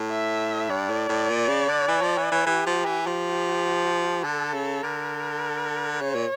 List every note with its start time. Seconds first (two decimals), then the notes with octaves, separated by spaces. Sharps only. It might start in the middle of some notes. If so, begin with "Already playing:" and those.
Already playing: A2
0.11 E5
0.69 G2 D5
0.90 A2
1.09 A2
1.29 A#2
1.49 C#3
1.69 D3
1.88 E3
2.02 F3
2.18 E3
2.32 E3
2.47 E3 G4
2.67 F3
2.86 E3
3.06 F3 G4
4.24 D3 A4
4.54 C#3
4.83 D3 A#4
6.01 C#3 C#5
6.15 A#2